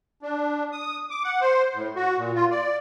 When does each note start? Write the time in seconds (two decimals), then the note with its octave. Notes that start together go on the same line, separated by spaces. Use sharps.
0.22 D4
0.72 D#6
1.10 D6
1.24 F#5
1.41 C5
1.75 A2
1.96 F#4
2.18 A#2
2.35 F4
2.51 D5